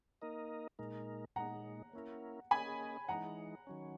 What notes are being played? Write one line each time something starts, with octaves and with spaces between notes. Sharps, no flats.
A#3 D#4 A#4 D#5
A#2 G#3 D#4 A#4
A#2 G#3 D#4 F#5 A#5
A#3 C#4 E4 A#4
A#3 C#4 G#4 D#5 G#5 B5
E3 G#3 D#4 F#5 A#5
D#3 F#3 C#4